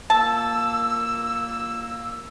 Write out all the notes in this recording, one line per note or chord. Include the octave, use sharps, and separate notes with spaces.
A#2 A#3 A5 E6